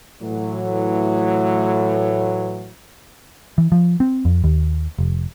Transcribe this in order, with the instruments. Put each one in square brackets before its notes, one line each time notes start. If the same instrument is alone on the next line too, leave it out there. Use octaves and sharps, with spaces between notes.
[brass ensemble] A2 E3 F#3
[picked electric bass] E3
F3
C4
F2
D#2
F1